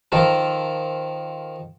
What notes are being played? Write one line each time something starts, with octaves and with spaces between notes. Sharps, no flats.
D#3 F3 A4 A#4